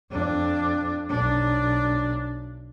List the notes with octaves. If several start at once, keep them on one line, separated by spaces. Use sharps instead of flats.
F2 D4
B1 D4